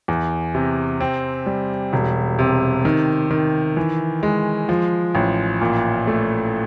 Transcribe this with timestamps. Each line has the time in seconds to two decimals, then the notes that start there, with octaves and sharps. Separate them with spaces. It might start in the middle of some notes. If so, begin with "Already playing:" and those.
0.08 E2
0.55 C3
1.00 C4
1.46 G3
1.93 E1
2.39 C3
2.85 D#3
3.31 D#3
3.77 E3
4.23 G#3
4.69 F3
5.15 A1
5.61 A#2
6.07 A3